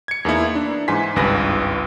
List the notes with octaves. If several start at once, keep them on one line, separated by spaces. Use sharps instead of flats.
G#6 C#7
E2 A#3 D#4 E4
D4
G#2 E3 G#5 C6 B6
G#1 C#2 G2 B4 A#6